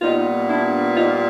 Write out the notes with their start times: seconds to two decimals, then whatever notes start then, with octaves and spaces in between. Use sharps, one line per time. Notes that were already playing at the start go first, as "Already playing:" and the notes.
0.01 A#2 G3 B3 D#4 F4
0.49 D4 E4
0.95 D#4 F4